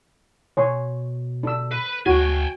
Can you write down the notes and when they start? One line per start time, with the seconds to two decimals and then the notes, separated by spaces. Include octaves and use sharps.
0.57 B2 C#5 G#5 C6
1.43 D4 E6
1.71 B4
2.06 D2 F#4 G5 G#5